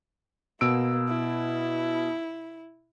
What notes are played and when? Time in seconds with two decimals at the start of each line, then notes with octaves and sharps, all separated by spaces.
0.61 B2 A#3 E6 D7
1.08 E4